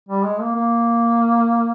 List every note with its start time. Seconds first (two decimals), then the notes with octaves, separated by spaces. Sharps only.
0.09 G3
0.25 G#3
0.40 A#3
0.55 A#3